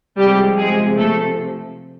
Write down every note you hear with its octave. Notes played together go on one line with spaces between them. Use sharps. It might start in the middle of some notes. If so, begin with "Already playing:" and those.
C3 F3 G3 G#3 G4
G#3 G#4
A3 A4